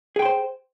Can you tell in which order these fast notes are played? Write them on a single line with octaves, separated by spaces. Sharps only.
G#4 G5 C6 C5